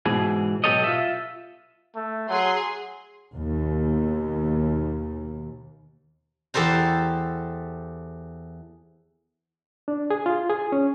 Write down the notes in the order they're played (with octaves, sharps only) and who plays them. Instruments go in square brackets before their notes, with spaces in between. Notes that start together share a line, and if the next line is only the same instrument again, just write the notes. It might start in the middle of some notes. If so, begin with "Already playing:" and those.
[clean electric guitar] G#2 B2 E3 G#4
B1 B2 G4 A4 C#5 D#5
F4 E5
[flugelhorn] A3
[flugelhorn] F#3 [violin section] G#4 C6
[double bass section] D#2 B2
[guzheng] E2 G4 A4 C5 A#5
[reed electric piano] D4
G#4
F4
G#4
C#4